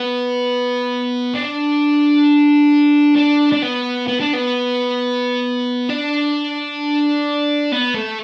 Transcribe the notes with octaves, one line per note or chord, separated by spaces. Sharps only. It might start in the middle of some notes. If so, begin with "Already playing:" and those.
Already playing: B3
D4
D4
D4
B3
B3
D4
B3
D4
B3
A3